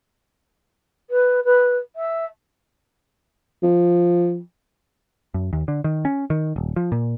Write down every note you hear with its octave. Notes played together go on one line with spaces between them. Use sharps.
B4
B4
E5
F3
F#2
D#2
D3
D#3
C#4
D#3
D#1
F3
A#2